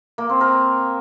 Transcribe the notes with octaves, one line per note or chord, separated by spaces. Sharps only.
A#3
C4
A#4